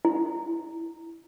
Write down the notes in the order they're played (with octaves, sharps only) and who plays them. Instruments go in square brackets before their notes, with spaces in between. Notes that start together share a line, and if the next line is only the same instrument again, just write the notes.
[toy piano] E4